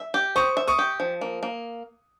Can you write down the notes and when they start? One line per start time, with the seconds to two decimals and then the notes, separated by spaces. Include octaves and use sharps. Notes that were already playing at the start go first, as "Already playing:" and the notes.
Already playing: E5
0.14 G4
0.36 C5 C#6 D#6
0.57 E5
0.68 C#6 D#6
0.79 G4
1.00 F3
1.21 A#3
1.43 A#3